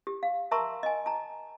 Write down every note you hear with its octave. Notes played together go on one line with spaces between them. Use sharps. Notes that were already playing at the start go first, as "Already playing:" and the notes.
G4
F5
A#4 E5 A5 A#5 C6 C#6
D#5 G#5
A5 A#5